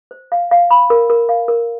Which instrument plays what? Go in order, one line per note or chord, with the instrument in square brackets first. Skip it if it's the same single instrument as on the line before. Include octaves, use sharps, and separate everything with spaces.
[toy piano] C5
F5
F5
B5
A#4
A#4
F5
A#4